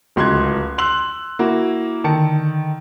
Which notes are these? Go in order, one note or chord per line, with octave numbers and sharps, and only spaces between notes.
D1 C#2 C6 F#6 G#6
C6 E6 F#6 F#7
A#3 E4 F#4
D3 D#3 A5 C#7